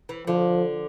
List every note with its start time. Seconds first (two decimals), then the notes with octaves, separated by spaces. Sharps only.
0.09 E3
0.27 D3 F3